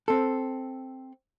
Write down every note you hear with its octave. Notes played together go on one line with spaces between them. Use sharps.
C4 A4